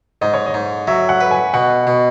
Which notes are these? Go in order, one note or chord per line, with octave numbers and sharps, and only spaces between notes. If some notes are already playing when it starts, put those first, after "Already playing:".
G#2 D#5
C#5
D#5
G#2
F#3 E5
F#5
B4
G#5
B2 F#5
B2